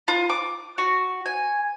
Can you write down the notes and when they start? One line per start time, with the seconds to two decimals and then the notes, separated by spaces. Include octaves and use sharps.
0.08 F4
0.30 D6
0.78 F#4
1.26 G#5